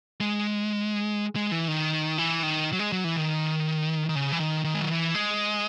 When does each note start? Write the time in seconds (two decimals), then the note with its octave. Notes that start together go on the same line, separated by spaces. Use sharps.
0.21 G#3
1.36 G#3
1.52 E3
1.68 D#3
2.18 E3
2.43 D#3
2.73 F#3
2.79 G#3
2.92 F#3
3.04 E3
3.16 D#3
4.09 D#3
4.15 C#3
4.32 E3
4.40 D#3
4.64 D#3
4.74 G#3
4.81 F#3
4.89 E3
5.15 G#3